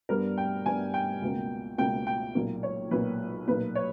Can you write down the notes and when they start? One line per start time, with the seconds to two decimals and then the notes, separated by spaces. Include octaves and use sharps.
0.09 G2 G3 B3 A#4
0.38 G5
0.66 G2 G3 B3 G#5
0.94 G5
1.22 C#2 B2 A#3
1.78 C#2 B2 A#3 G5
2.07 G5
2.35 B1 A#2 A#3
2.63 C#5
2.91 B1 A#2 A#3 B4
3.47 B1 A#2 A#3 B4
3.75 C#5